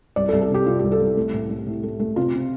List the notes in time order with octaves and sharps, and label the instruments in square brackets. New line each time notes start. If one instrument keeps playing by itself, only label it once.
[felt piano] C2 D5
A4
C2
A4
C3 G4
C3 F4
G4
C2
A4
C2
A3
A2
A3
A2
A3
A3
C3 F4
C3